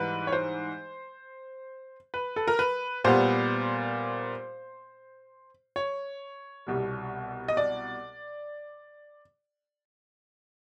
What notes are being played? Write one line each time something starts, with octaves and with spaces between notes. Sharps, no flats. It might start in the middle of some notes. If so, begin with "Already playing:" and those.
Already playing: G#2 E3 G3 B4
C#5
C5
B4
A4
A#4
B4
A#2 G3 B3 C5
C#5
C2 B2 G3
D#5
D5